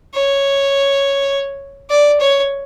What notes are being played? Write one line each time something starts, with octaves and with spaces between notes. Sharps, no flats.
C#5
D5
C#5